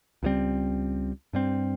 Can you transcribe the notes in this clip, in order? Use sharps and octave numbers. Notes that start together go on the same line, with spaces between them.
C#2 C3 G3 C4
G2 G3 C4